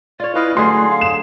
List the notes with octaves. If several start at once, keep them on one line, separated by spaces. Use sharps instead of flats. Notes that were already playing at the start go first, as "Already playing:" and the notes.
F4 C#5 D5
C#4 E4 B4 D#5 F5
D3 F#3 A3 G#4 C6
F5
E7